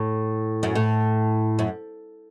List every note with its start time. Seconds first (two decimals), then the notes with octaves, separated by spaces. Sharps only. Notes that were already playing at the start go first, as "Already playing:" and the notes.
Already playing: A2
0.63 F#2
0.75 A2
1.59 F#2